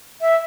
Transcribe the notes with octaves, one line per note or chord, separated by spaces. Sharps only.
E5